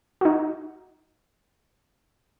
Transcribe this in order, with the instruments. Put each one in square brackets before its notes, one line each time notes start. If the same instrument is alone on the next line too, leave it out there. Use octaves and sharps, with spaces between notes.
[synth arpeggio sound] D#4 F#4